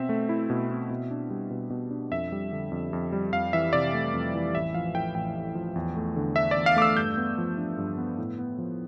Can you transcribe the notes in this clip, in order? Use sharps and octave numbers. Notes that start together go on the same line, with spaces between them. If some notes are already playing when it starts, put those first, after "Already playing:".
Already playing: B2 C4 E5
A3
E4
B2
C4
B2
D4
G3
B2
B2
D4
F2 E5
G3
D3
F2
F2
G3
F2 F5
E3 E5
C3 D5
A3
F2
E3
A1 E5
F3 F5
A2 G5
A1 G5
A1
F3
E2
A3
D3
D4 E5
D5
E2
F5
A3 D6
E6
G2 G6
B3
F3
D4
G2
B3
A2
B3
F3